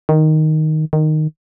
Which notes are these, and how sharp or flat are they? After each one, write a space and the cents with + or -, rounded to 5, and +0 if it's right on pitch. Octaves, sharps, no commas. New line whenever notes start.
D#3 +0
D#3 -10